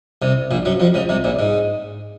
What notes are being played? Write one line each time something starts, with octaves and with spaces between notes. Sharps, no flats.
C2 C3
A#1 A#2
F#2 F#3
F2 F3
C#2 C#3
C2 C3
A#1 A#2
G#2